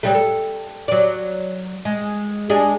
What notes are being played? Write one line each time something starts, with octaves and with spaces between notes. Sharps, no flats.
F#3 G3 A3
A4
F#3 D5
G#3
G#3 D4 G#4